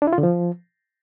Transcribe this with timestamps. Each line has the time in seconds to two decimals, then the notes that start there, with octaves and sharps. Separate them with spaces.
0.02 D4
0.07 E4
0.13 F4
0.18 D3
0.23 F3